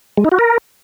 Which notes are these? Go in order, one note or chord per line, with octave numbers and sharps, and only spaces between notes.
G#3
D#4
F#4
A#4